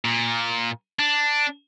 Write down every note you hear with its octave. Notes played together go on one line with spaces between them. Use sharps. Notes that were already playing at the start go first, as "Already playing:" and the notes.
A#2
D4